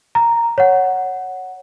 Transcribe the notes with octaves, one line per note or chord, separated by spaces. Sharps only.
A#5
C#5 F#5